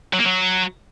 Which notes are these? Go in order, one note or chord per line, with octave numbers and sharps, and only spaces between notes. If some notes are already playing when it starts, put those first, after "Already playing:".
F#3
A#3
F#3